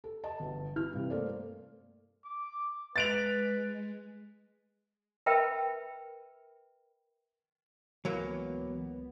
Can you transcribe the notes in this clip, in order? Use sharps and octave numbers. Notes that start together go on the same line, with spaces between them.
A4
D#5 A5
G1
E3 E4 F6
G2 C3
A3 A#3 A4 C5 D5
D6
G#3 B4 A6 D7 F7
A#4 B4 E5 G5 A5 B5
C#2 E3 F#3 A#3 B3